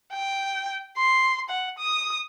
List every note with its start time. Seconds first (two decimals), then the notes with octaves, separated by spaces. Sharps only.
0.12 G5
0.97 C6
1.50 F#5
1.78 D#6